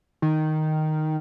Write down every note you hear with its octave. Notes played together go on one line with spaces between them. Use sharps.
D#3